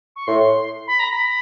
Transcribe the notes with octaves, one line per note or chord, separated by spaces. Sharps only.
C#6
A2 C6
B5
A#5
B5